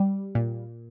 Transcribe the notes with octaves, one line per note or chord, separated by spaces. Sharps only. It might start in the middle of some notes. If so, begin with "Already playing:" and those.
Already playing: G3
A#2